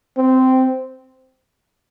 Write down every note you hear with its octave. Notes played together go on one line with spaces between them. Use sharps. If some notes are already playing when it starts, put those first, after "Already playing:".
C4